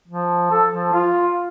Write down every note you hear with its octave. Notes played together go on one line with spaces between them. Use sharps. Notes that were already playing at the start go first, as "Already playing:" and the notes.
F3
A4
F3
F4